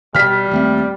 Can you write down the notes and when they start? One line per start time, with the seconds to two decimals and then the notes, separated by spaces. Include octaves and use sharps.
0.15 B2 G3 F6 B6
0.51 D#1 A3 C4